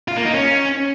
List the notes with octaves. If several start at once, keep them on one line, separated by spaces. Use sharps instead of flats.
F4
A#3
D#4
C#4